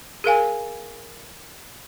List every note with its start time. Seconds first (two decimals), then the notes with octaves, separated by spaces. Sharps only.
0.24 G#4 A#4 F5 G#5